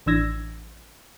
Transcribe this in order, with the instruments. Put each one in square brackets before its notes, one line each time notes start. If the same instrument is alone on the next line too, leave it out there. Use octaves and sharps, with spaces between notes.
[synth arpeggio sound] A1 E3 D4 E6 G#6 A#6